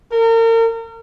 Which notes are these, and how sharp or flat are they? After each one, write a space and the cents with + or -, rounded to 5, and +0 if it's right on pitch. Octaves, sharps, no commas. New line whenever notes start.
A#4 -35